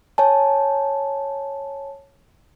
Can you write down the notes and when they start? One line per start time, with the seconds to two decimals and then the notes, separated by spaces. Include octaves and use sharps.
0.18 C#5 G#5 A5